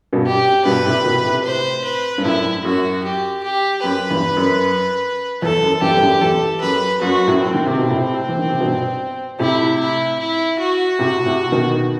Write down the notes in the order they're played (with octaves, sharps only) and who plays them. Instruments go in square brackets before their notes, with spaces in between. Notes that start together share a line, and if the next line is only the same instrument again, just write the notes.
[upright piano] G2 B2
[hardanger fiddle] G4
[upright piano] G2 B2 [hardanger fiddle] B4
[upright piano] A2 C3
B2 D#3
A2 C3
[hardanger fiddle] C5
B4
[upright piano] G2
[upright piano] F#2 A2 [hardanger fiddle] E4
[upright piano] F#2 [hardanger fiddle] F#4
[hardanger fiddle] G4
G4
[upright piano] F#2 [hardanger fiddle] B4
[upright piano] E2 G2
F#2
[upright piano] E2 [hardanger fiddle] A4
[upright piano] F#2
[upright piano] E2 G2 [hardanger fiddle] G4
[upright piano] G2
F#2 A2
[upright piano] E2 [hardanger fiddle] A4
[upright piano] F#2 [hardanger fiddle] B4
[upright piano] F#2 [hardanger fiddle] F#4
[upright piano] F#2 A2
[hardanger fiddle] C4
[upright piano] D#3
C3
B2
A2 C3
E3
D#3
C3
G2 B2
[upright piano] A2 C3 [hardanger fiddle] E4
[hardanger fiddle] E4
E4
F#4
[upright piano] A2 C3
A2 C3
B2 D#3